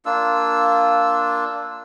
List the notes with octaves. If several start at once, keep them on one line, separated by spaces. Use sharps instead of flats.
A#3 D4 F4 E6